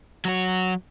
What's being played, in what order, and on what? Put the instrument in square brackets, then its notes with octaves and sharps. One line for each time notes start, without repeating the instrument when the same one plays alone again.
[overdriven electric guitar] F#3 F#4